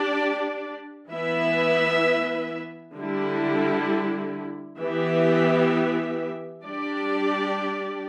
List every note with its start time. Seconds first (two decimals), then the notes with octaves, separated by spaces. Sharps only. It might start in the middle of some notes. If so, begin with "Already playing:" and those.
Already playing: D4 G4 D5
1.10 E3 B3 E4 B4 E5
2.95 D3 G3 E4
4.80 E3 B3 G4 E5
6.65 G3 D4 G4 D5